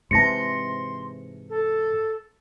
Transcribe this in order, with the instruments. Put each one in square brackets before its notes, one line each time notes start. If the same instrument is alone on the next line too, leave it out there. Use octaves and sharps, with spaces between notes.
[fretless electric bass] G#2 C3 E3 [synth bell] A5 A#6 C#7 [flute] C6
[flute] A4